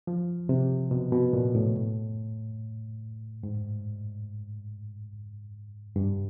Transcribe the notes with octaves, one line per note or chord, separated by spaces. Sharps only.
F3
C3
B2
B2
A#2
A2
G#2
G2